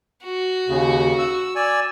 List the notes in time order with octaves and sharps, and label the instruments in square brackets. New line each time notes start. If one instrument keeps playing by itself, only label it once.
[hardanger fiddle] F#4
[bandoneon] D#2 C#3
E6
D5 G#5 E6